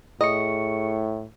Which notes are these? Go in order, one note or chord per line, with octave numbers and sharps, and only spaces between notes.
A2 G#4 D#5 C#6 C#7